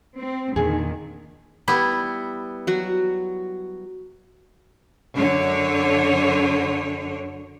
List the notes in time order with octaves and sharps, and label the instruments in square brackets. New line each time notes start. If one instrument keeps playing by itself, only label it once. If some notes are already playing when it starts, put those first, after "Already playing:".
[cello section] C4
[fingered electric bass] E2 A#2 D3 [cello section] D#3 [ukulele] G#4
[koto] G3 B3 E4
[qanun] F#3 F#4
[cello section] F#2 D3 C#5